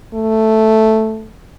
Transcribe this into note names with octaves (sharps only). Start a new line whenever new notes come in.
A3